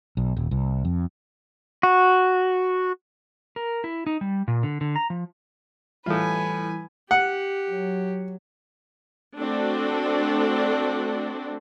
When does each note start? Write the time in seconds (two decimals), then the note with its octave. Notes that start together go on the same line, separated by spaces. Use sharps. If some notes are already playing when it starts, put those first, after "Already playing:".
0.17 B1
0.37 D#1
0.51 C2
0.85 F2
1.83 F#4
3.56 A#4
3.84 E4
4.07 D#4
4.21 G3
4.48 A#2
4.63 D3
4.81 D3
4.96 A#5
5.10 F3
6.06 A2 E3 G3 E4 F4 B4 G#5
7.11 G4 F#5
7.70 F#3
9.38 A3 C4 D4 F#4 A4